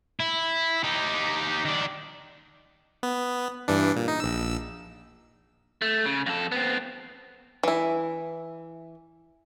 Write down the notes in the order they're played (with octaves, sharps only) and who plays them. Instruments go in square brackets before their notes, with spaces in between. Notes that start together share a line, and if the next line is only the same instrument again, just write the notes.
[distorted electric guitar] E4
D#4 G4
D#3 D4
[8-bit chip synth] B3
G2 E3 D4
A#2
D#4
A#1 E6
[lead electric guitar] A3
C#3
F2 A4
B3 C4
[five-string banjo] E3 E4